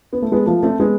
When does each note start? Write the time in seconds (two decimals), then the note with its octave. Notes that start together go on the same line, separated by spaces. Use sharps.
0.13 B3
0.22 A3
0.32 G#3 B3
0.46 F3 A3
0.63 A3 C4
0.80 G#3 B3